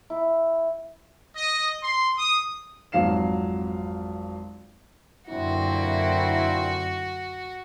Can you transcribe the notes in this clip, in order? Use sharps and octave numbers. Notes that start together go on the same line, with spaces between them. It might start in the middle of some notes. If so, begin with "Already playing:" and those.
E4
D#5
C6
D#6
G#1 F2 F#3 F5 C7 E7
F#2 A#2 D3 C4 E4 F#4